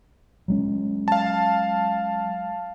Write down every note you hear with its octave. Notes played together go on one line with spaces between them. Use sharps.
F#3 G#3 C#4
F5 A5